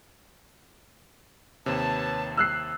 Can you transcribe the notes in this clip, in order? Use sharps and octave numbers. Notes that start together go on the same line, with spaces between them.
D#2 C3 B4 C#5 A5
E6 F#6 C7